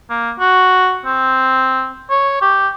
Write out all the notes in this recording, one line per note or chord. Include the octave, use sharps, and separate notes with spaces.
A#3
F#4
C4
C#5
G4